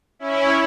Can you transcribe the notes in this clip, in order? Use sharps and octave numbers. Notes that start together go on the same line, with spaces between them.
C#4 E4